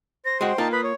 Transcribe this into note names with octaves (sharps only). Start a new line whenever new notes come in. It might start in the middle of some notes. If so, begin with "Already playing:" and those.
C5 A#6
G#3 F#4 G5
A#3 D#4 F4 A5
B4 B5 D#6
C#5